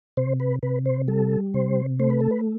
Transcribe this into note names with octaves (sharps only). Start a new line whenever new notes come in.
C3 C5
B4
C3 B4
C5
G3 A4
C3 C5
A3 C5
B4
A4
B4